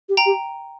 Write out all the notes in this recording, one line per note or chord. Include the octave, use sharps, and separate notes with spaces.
G4
G5 A#5
G4